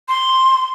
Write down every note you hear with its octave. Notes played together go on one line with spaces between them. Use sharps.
C6